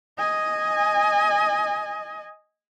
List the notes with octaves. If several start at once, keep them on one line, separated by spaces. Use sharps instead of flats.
D#5 G#5